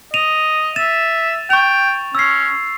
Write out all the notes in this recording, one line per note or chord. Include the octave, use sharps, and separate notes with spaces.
D#5 D#7 F7
E5 A6 E7
G5 C#6 F7
C#4 E6 C7